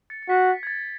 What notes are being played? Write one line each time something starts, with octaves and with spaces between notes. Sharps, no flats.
A6 C#7
C#7
F#4 B6
G#6
A6